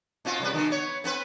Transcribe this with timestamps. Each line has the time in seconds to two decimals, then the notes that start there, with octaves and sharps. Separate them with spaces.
0.25 B2 C4 F4
0.40 C3 G3 B4
0.54 B2 D3
0.70 B3 C#5
1.04 B3 C4 B4